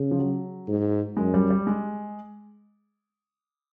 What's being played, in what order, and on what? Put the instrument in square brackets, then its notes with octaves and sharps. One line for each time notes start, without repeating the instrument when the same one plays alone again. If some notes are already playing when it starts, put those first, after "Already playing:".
Already playing: [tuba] C#3
[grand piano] F3
F#3
[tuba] G#2
[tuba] F#2 [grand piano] G#3
[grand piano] G3
G3
G#3